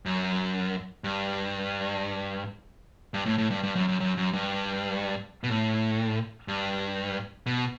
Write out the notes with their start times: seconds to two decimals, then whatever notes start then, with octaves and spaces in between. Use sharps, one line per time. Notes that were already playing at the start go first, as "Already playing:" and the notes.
0.06 F#2
1.04 G2
3.14 G2
3.26 A2
3.38 A2
3.51 G2
3.64 G2
3.76 F#2
3.88 F#2
4.00 F#2
4.17 F#2
4.33 G2
5.44 B2
5.49 A2
6.48 G2
7.46 B2